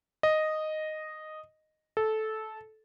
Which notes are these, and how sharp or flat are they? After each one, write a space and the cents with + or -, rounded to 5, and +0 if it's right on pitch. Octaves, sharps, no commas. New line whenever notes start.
D#5 -5
A4 -15